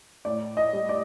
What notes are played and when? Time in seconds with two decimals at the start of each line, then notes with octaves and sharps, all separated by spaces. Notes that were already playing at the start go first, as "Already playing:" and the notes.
0.25 A2 D5
0.57 D#5
0.73 G3
0.89 D5